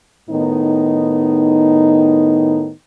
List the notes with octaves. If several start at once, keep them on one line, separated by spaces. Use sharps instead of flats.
A2 D#3 B3 D#4